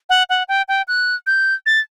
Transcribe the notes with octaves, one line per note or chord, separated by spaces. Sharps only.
F#5
F#5
G5
G5
F#6
G6
A6